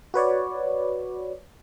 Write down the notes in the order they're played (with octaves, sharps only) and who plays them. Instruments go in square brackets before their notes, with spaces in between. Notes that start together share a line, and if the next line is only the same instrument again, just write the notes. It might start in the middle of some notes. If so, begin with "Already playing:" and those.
[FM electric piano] F#4 B4 C#5 D5